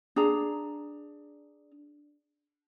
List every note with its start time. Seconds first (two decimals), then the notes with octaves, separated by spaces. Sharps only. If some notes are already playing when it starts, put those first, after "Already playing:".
0.16 D4 G#4 A#5